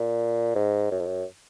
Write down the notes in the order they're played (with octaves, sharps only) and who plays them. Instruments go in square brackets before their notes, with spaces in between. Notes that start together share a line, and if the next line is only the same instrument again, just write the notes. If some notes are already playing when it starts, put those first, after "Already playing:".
Already playing: [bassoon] A#2
G#2
F#2
F2
F#2